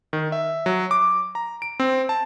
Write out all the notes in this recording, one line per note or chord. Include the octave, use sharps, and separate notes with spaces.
D#3
E5
F#3
D6
A#5
D7
C4
A5